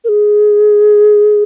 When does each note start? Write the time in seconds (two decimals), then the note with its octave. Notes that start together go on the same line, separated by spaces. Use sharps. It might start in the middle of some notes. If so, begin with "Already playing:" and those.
0.04 A#4
0.09 G#4